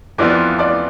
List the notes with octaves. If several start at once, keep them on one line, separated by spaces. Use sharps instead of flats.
F2 E3 B3 F4 D5 D6
D5 D6